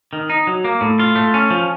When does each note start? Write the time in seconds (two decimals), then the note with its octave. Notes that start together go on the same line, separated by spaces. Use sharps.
0.13 D#3
0.30 D#4
0.47 F#3
0.65 A#3
0.81 A2
0.99 F4
1.16 A3
1.34 C#4
1.50 F3